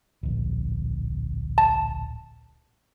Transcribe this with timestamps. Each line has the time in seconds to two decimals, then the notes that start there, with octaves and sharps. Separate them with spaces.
0.23 D1 A#1
1.58 A5